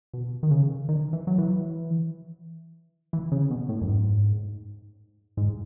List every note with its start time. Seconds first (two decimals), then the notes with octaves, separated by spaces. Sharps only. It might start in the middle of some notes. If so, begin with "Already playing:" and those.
0.13 B2
0.43 D#3
0.51 C#3
0.88 D#3
1.13 E3
1.27 F#3
1.38 E3
3.13 E3
3.32 C#3
3.50 B2
3.69 A2
3.81 F#2
3.88 G#2
5.37 G#2